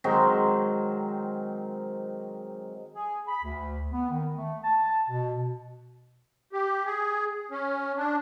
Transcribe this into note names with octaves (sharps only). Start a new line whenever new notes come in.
D#3 F#3 G#3 C4
G#4
B5
D2
B3
D#3
A3
A5
B2
G4
G#4
C#4
D4